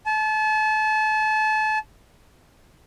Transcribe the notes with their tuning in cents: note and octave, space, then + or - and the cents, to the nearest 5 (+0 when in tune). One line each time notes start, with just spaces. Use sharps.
A5 -35